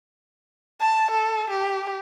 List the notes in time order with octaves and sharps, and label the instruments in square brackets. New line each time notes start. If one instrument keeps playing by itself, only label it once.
[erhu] A5
A4
G4